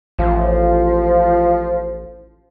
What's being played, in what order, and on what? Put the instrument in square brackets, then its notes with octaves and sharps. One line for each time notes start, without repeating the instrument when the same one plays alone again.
[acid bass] A1 [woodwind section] F3